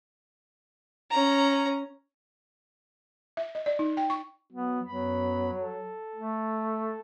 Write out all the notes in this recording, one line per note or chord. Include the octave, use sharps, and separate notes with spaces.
C#4 A#5
E5
D#5
D5
D#4
G5
C#6
F#3 B3
F#2 F#3 B3 B5
A4
A3